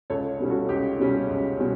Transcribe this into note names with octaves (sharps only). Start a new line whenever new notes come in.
C#2 A4 C#5
B2 G3 C#4
F#4 A4
C#2 G4
B2 G3 C#4
C#2
B2 G3 C#4